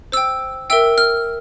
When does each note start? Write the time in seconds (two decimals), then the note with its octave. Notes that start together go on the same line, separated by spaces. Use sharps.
0.12 C5 G5 E6
0.70 A#4 E5 G5 E6
0.98 F6